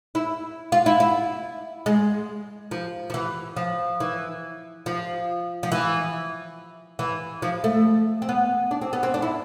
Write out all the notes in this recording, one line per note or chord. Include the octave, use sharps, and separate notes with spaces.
E4
F4
E4
E4
G#3
F3
F3
E3
F3
E3
F3
F3
E3
E3
F3
A3
C4
B3
D4
C4
B3
C4
D4
E4